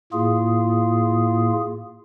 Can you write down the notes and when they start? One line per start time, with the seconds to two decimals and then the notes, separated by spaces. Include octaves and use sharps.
0.13 A2 A#3 F4 G#4